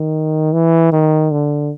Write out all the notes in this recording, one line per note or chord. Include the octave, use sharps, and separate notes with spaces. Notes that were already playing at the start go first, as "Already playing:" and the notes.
Already playing: D#3
E3
D#3
D3